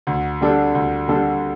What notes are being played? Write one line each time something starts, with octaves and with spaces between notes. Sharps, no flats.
D2
D3 G3 D4 A4
D2
D3 G3 D4 A4